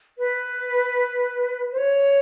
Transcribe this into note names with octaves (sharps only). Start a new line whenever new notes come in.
B4
C5
C#5